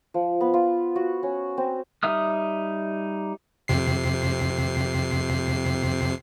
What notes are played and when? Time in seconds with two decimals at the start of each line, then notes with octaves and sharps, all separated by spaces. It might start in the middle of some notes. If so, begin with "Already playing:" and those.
0.14 F3
0.41 B3
0.54 F4
0.96 F#4
1.23 C#4
1.57 C4
2.03 G3 D#4 E5 D#6 F6
3.68 F2 C3 C7